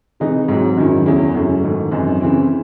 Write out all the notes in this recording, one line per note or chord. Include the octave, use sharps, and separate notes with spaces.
C3 E3 G#3 D#4
G#2 F#3 C4
F#2 D#3 F#3 C#4 E4
E2 C#3 G#3 C#4 E4
F#2 C#3 F#3 A3 C#4
G#2 D#3 A3
F#2 E3 C4 D#4
C#3 E3 C4 E4